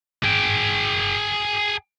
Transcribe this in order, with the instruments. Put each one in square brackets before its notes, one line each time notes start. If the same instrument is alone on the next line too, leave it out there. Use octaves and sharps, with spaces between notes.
[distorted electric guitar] G#4 G5